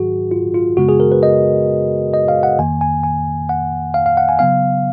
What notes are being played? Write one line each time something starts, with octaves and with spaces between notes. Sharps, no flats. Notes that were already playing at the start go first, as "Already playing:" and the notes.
Already playing: G#2 D#3 F#3 F#4 G#4
F4
F4
F#2 C#3 G#3 B3 F#4
G#4
A#4
B4
D#5
D#5
F5
F#5
F2 D#3 A#3 G#5
G#5
G#5
F#5
F5
F5
F#5
G#5
C#3 F#3 B3 F5